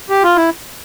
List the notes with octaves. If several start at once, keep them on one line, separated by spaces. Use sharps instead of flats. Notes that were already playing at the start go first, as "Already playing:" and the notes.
G4
F4
E4